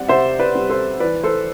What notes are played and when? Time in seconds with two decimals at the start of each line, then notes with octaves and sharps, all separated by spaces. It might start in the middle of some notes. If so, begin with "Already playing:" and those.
Already playing: G3 C4 D5 F#5
0.09 C3 C5 E5
0.39 B4 D5
0.55 G3 C4
0.70 A4 C5
1.00 E3 B4 D5
1.24 A4 C5